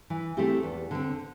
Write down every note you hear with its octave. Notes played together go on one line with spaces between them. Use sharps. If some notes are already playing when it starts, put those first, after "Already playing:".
E3
A3 C4 E4 G4
E2
D3 C4